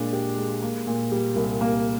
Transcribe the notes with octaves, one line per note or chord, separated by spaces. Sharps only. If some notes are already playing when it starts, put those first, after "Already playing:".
Already playing: A#2 G#3 D4
G4
G#3
A#3
A#2
G3
C2
A#3